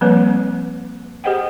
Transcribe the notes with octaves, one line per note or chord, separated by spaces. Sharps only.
F3 G3 A#3 C4 B4 C#5
G4 G#4 C5 D#5 F#5 G5